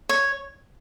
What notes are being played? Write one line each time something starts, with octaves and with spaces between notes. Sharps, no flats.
C#5